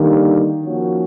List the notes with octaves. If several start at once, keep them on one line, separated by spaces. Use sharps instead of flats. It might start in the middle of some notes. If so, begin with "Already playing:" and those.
Already playing: D3 D#3 G3 A#3 D#4 G4
F3 A#3 C#4 F#4